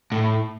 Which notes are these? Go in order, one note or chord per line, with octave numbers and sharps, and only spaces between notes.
A2